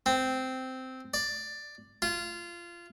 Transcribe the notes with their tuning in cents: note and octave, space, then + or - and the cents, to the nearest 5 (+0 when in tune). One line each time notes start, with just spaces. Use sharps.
C4 -10
D5 +5
F4 -20